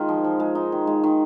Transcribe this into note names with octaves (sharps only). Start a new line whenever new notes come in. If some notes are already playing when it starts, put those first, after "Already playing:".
Already playing: D#3 G#3 D#4 F4
F3
F3
G#3
D#4
D#3
G#3
D#3